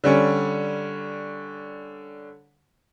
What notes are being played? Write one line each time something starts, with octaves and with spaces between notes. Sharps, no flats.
D3 G3 C#4